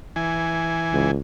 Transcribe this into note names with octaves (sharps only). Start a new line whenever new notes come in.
E3 G#5
C#2